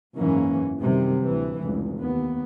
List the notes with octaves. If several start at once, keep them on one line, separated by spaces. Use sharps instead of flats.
F#1 E2 G#2 E3 A#3 C#4
F#2 C3 D#3 G3
D2 A2 E3
F1 C#2
D#2 B3